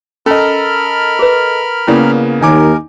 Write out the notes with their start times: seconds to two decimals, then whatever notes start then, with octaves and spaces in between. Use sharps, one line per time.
0.26 C#4 A4 A#4 D#5 A#5 B5 F6
1.19 G#4 B4
1.87 C#3 A#3 B3 C#4 E4 D5
2.41 D#2 D#4 A#4 G#5 D6